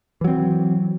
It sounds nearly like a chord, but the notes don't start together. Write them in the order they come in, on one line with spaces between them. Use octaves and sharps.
E3 F#3 C4